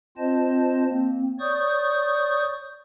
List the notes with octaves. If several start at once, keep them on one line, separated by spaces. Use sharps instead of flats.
C4 F4 C5 D#5 A5
A#3 C4
C#5 D5 C#6 D#6 G6